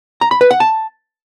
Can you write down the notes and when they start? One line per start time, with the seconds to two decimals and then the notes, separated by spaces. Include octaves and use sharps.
0.21 A#5
0.31 B5
0.41 B4
0.51 F#5
0.60 A5